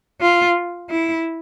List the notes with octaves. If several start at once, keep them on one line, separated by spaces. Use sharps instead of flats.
F4
E4